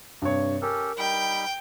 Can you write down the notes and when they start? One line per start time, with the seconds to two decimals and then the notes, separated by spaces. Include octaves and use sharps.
0.22 G2 C3 C#5
0.62 C#4 G4 A4 A#4
0.98 G3 D#4 G5 B5